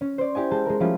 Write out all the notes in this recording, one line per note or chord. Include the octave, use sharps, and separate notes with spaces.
C#4
C5 D5
E4 G4 D#5 G#5
G#3 A5 G6
G#3 A#4
F3 G3 A3 C#4 E4 F4